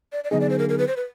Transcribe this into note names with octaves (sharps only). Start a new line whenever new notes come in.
D5
D5
D3 F#3 B3 D#4 G#4 D#5
D5
C5
A#4
A#4
B4
C5
B4